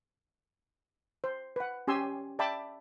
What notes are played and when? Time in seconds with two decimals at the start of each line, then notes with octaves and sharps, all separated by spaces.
1.24 C5
1.56 B4 F#5
1.88 C#4 G4 G#5 C6 E6
2.39 D5 E5 G5 A5 B5 D6